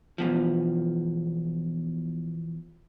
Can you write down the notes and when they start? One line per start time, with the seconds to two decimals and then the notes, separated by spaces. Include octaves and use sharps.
0.18 E2 B2 F3